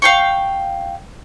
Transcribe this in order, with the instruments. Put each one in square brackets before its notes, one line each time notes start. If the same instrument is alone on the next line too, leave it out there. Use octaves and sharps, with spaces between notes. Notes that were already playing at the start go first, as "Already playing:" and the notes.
[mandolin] F5 G5 C#6